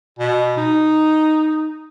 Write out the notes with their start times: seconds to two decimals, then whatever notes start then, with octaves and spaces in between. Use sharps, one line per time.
0.19 B2
0.57 D#4